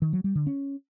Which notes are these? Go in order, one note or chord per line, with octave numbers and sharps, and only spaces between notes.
D#3
F#3
G3
D3
C#4